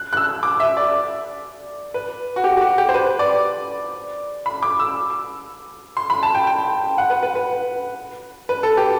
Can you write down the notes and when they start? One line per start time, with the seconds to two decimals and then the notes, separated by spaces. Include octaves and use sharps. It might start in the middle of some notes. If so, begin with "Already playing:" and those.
Already playing: F#6
0.13 F#6
0.17 E6
0.43 D6
0.60 E5
0.77 D5
1.94 B4
2.36 F#4
2.44 G4
2.57 G4
2.61 F#4
2.78 G4
2.89 C5
2.94 B4
3.19 D5
4.46 B5
4.63 D6
4.80 E6
5.97 C6
6.10 B5
6.23 A5
6.35 G5
6.47 G5
6.98 F#5
7.10 B4
7.23 B4
7.35 B4
8.49 B4
8.63 A4
8.77 G4